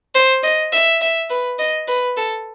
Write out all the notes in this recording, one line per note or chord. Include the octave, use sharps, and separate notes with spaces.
C5
D#5
E5
E5
B4
D#5
B4
A4